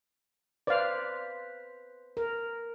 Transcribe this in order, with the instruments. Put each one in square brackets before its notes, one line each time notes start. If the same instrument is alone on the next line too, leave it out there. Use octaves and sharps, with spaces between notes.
[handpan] B4 C5 [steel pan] D5 F5
[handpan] A#4